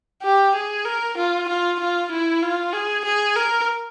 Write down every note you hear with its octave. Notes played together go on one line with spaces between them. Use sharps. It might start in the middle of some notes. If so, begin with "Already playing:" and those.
G4
G#4
A#4
F4
F4
F4
E4
F4
G#4
G#4
A#4